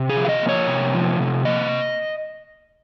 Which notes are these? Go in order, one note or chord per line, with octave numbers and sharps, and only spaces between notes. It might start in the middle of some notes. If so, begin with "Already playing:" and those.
Already playing: C3
G#4
F3
F5
D#5
A#3
C#5
C3
F3
C3
A#3 D#5